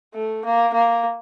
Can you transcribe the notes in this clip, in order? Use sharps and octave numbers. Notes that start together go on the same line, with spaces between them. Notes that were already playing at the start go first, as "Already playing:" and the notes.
A3
A#3
A#3